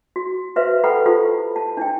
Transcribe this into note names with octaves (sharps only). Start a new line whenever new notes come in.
F#4
F#4 B4 C5 E5 F5
A4 B4 F#5 G5 A#5 B5
E4 F4 G4 A4 C5
A5
D4 E4 G5